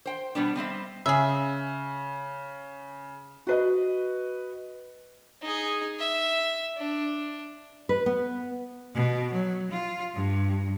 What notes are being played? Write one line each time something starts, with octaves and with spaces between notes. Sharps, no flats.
C5 G5
B2 G3 B3 D4
G3 C4 D#5 E5
C#3 G#4 E5
F#4 B4 D#5
D#4 G#4
E5
D4
B4
B3
B2
F#3
F4
G2